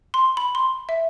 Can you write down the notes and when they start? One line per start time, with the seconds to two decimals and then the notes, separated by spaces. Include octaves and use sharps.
0.14 C6
0.37 B5
0.55 C6
0.89 E5